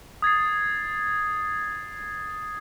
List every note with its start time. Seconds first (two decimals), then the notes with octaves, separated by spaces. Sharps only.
0.22 D#6 G#6 A6 C7